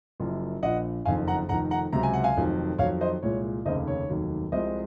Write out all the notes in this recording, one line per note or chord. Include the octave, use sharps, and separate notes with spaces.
F#1 F#2 F3
A#1 A#2 F3 D#5 F#5
F#1 F2 D#3 F5 G#5
F#5 A#5
F1 F2 D#3 F#5 A#5
F#5 A#5
C#2 C3 F#3 A#5
G#5
F#5
F5 G#5
F1 F2 D#3 F#3
F2 D#3 F#3 C#5 F5
C5 D#5
C2 A#2 F3 G#3 C#5
F1 D#2 C#3 C5 D#5
C#5
F1 D#2 D#3 F#3
C2 C3 F3 G#3 C5 D#5